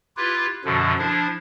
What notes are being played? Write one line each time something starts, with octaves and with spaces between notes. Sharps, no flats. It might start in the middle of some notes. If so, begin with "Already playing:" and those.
E4 F4 G4 B4
F#2 B2 D3 F3
F3 D4 E4